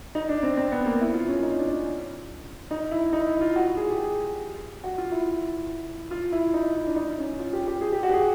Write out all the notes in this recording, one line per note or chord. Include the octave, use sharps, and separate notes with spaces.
D#4
D4
C4
C4
B3
A#3
E4
F4
C#4
D#4
D4
C#4
D#4
E4
D#4
E4
F4
F#4
G#4
G4
G#4
F#4
F4
E4
F4
E4
D#4
E4
D4
D#4
C#4
F4
G4
G4
G#4
G4
F#4
G4
G#4